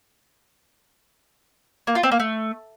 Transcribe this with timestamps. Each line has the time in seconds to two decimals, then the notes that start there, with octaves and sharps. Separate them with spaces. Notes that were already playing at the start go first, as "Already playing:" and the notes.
1.87 A#3
1.95 F4
2.03 C4
2.11 A#3
2.20 A3